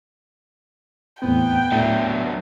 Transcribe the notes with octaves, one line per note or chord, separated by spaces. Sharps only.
E2 A2 B3 C4 G5
A2 F#3 D4 E5